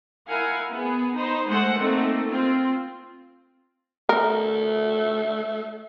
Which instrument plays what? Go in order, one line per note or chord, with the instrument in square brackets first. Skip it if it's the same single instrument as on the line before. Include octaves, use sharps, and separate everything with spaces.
[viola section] E4 A#4 F5 F#5 G#5
B3 G#4
D#4 C5 B5
G#3 A3 G#4 C5 F#5
A3 A#3 C4 D#4
C4 F4
[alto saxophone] A3 [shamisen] A#4